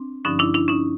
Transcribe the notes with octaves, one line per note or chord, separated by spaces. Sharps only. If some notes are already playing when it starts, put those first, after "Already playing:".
Already playing: C4 D4
G2 D3 F3 C#4 D#4
D4 E4
D4 E4
C#4 D#4